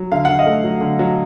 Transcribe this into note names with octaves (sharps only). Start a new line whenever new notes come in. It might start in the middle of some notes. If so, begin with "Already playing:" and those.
Already playing: F#3
D3 F5
D3 F#5
D#5 F5
A3
F#3
D3
F#3